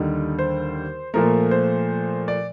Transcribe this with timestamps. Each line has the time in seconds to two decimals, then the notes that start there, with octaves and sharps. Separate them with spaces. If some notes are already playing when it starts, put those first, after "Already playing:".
Already playing: D#2 D3 G3 D#4
0.39 C5
1.14 A#2 F3 A3 A#4
1.51 C5
2.28 D5